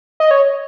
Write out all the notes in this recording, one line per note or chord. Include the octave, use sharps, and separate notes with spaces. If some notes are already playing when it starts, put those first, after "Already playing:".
D#5
C#5